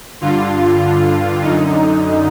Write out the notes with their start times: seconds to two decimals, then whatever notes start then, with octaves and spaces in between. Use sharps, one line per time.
0.21 G2 D3 F4
1.43 F#2 D3 D#4